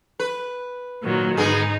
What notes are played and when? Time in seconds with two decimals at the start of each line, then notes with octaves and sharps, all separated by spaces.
0.20 B4
1.03 A#2 D#3 F#3
1.37 G#2 D3 B3 D#4 G#4